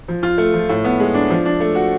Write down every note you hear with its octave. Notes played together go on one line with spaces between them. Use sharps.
F3
F4
A3
F3
A2
B3
G#3
D4
F3
D4
A3
F#4